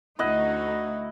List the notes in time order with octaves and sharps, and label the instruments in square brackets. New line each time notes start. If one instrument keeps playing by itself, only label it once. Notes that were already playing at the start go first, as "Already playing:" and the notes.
[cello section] D2 D#4 F#4 [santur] E4 D#5 F#5